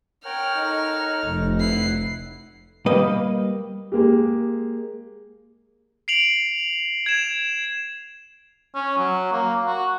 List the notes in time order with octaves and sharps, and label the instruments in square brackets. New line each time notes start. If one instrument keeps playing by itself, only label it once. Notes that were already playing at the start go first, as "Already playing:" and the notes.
[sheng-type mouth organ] A#4 C#5 F#5 [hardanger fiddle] G5 [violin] F6
[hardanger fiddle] D#4 A4
[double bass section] F1
[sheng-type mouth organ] E4 B4 F#5 [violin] C7
[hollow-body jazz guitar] G3 A#3 B4 D#5
[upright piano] G#3 A#3 G4
[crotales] C7 D7 F7 F#7
G#6 E7
[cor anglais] C#4
F#3
A#3
F#4